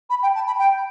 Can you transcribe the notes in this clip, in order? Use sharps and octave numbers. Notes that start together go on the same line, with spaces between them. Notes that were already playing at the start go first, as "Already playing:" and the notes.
B5
G5
A5
B5
G5